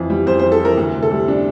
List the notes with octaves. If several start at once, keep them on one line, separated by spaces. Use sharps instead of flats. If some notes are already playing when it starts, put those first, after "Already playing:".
Already playing: F2 E3
G3
F2 C5
C5
F2
A4
E3 A#4
D2
C3
A4
G3
D4